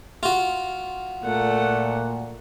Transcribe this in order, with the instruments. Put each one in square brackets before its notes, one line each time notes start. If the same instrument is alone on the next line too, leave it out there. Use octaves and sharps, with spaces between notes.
[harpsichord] F4 F#4
[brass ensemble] A#2 [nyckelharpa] A3 F#5